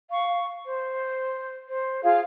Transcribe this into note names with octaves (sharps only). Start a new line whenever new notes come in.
F5 C#6
C5
C5
F4 G#4 F5